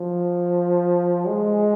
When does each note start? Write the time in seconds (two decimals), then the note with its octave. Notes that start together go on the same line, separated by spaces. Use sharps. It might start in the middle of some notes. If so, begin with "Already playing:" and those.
Already playing: F3
1.28 G#3